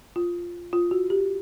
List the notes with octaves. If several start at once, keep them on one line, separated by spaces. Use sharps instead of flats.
F4
F4
F#4
G4